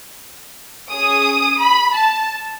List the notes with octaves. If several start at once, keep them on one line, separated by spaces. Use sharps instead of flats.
C#4 G#4 D#6
B5
A5